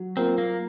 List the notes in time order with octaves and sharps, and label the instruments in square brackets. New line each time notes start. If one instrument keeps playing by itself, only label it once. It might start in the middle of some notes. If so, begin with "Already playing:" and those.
Already playing: [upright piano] F#3
[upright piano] A#3 F4 A#4 [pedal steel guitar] C4
[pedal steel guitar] A#3